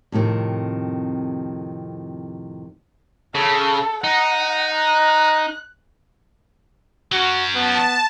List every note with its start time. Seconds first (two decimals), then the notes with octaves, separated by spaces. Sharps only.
0.12 F2 A2 C3 D#3
3.35 C#3 A4
4.04 D#4 F#5
4.75 F#6
7.12 F#3 C#4 F#4
7.55 B3 A5